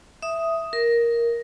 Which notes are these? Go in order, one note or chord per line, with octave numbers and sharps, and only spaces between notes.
E5 D#6
A#4